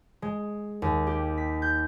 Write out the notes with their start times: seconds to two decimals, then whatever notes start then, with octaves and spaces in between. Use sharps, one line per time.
0.22 G#3
0.82 D#2
1.07 G4
1.37 B6
1.62 G6